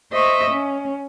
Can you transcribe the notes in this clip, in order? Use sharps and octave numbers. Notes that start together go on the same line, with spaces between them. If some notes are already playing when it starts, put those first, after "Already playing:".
C5 D#5 E5 C#6
C#4